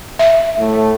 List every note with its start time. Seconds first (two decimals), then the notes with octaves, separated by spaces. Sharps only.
0.19 E5
0.57 A2 A3